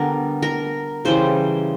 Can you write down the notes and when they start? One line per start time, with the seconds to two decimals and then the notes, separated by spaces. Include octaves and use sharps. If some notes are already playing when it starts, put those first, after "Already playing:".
Already playing: D3 G3 B3 A#4
0.42 A#4
1.05 C#3 E3 G3 C5